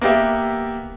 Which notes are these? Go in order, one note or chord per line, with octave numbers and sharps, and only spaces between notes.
A#3 B3 G4 E5